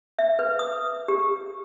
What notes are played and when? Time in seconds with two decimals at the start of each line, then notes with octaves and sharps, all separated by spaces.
0.19 E5
0.39 B4
0.59 D#6
1.08 G4